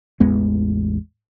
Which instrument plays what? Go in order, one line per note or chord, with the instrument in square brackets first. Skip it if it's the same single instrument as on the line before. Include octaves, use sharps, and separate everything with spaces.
[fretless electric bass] A1 E2 G#3 B3